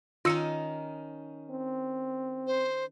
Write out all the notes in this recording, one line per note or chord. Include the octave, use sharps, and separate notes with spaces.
D#3 C#4 D#4 F4 E6 C#7
C4
C5